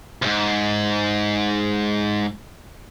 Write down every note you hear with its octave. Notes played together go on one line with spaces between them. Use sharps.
D2 G#2